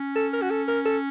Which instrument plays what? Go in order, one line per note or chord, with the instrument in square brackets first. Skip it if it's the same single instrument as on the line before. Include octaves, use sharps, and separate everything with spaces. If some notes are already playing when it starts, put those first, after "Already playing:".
Already playing: [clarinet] C#4
[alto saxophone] A4
A#4
F#4
A4
A#4
A4